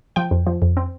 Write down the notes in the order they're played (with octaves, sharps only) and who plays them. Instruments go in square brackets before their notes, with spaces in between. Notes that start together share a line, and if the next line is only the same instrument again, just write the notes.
[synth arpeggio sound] F3 G5
F2
F3
F2
C4